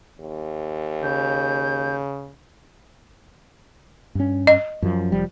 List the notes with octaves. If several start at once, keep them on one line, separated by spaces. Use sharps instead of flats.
D#2
C#3 G6
G2 C#4
D#5
F#2 F3
F1 F3 G3